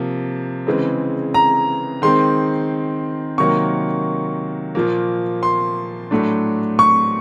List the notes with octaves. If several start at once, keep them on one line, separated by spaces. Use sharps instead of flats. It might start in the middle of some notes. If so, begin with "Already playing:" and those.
Already playing: C3 F3 A#3
C#3 E3 G#3 C4
A#5
D#3 G#3 C4 C6
C3 D#3 F#3 A#3 C#6
A#2 F3 A#3
C6
A2 F#3 A3 D4
C#6